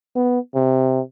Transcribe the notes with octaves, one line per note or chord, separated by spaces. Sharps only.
B3
C3